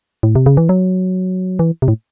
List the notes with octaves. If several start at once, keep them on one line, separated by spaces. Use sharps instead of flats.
A2
C3
C#3
E3
F#3
E3
C3
A2